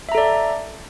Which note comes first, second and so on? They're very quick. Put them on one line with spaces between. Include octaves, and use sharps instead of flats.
E5 A#5 A4 D5